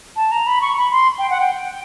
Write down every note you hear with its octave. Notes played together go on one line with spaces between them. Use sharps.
A5
A#5
B5
C#6
B5
C6
G5
F#5
G5